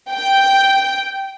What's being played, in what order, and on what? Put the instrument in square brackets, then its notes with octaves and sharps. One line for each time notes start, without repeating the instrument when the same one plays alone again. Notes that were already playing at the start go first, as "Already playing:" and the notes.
[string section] G5